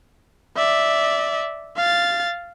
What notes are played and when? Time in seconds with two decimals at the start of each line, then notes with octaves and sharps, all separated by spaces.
0.57 D5 E5
1.77 F5 A6